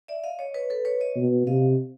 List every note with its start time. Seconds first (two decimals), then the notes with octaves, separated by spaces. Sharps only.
0.08 D5 E5
0.24 D#5 F5
0.39 C#5 D#5
0.54 B4 C#5
0.70 A4 B4
0.85 B4 C#5
1.00 C#5 D#5
1.16 B2
1.47 C3 D#5 F5